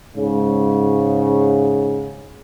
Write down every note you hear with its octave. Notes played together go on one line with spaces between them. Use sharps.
G#2 C#3